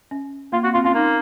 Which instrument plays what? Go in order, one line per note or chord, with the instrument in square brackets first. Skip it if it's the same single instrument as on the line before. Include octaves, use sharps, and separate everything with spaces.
[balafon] C#4
[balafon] A#3 [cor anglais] F4
[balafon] C4 [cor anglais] F#4
[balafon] C4 [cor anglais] F4
[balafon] C#4 [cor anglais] F4
[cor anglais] A#3 [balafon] D#4